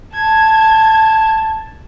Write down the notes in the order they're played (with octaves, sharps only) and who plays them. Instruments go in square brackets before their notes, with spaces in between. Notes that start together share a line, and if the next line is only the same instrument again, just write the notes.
[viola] A5 [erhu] G#6